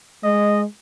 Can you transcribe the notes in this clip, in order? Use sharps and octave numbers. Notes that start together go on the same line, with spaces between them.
G#3 D#5